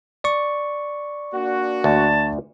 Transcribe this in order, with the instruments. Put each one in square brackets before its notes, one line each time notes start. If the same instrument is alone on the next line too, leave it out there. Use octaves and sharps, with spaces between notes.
[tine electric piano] D5 C#6
[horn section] A#3 D4 F#4
[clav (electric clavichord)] D2 [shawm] A5